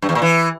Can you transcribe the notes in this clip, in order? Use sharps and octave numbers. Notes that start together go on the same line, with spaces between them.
G2
E2
A#2
E3